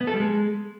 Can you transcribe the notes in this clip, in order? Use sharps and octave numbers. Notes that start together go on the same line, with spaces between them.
B3
A4
G3
G#3